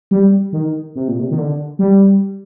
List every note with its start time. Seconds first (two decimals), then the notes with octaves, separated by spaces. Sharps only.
0.11 G3
0.53 D#3
0.95 C3
1.08 A#2
1.19 C3
1.31 D#3
1.38 D3
1.79 G3